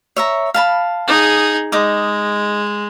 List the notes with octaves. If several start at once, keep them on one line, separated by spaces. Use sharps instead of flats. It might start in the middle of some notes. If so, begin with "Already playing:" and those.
C#5 E5 A#5
F5 A5 B5
D#4 G#4
G#3 D#4 D6 D#6